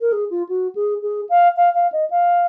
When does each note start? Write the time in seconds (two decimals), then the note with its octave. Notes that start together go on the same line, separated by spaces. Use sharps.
0.01 A#4
0.12 G#4
0.30 F4
0.49 F#4
0.75 G#4
1.02 G#4
1.29 F5
1.56 F5
1.74 F5
1.92 D#5
2.10 F5